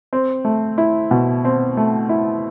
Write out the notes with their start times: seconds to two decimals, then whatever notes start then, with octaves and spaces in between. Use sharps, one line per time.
0.13 C4
0.45 A3
0.78 E4
1.11 B2
1.45 C4
1.77 A3
2.09 E4